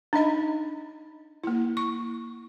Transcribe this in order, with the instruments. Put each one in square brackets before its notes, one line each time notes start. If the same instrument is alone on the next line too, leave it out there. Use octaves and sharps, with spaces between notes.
[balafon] D4 D#4 D#5 B5
A#3 E4
C#6